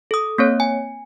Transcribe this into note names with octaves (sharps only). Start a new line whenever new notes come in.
A4 D#6
A#3 C4 C#5
G#5